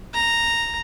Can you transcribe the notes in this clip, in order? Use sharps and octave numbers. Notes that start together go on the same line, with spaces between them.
A#5